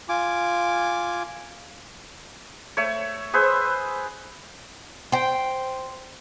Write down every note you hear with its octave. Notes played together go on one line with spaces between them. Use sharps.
F4 G#5 D6
A3 C#5
G#4 B4 C5 E5
C5 G5